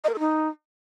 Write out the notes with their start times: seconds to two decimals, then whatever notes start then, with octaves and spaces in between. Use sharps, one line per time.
0.04 D#5
0.09 A#4
0.14 A4
0.19 D#4